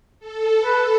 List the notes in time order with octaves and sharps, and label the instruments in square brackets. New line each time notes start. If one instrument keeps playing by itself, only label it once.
[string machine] A4
[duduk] B4